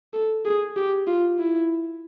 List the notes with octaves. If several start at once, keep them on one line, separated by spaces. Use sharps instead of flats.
A4
G#4
G4
F4
E4